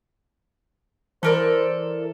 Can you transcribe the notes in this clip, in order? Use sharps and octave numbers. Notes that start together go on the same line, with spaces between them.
E3 A4 A#4 C5 D5